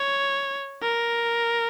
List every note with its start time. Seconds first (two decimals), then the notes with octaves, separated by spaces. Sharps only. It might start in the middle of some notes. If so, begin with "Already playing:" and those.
Already playing: C#5
0.82 A#4